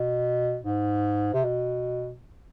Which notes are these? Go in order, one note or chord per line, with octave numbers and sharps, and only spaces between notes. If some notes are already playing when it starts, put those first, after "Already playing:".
Already playing: B2
G#2
C3
B2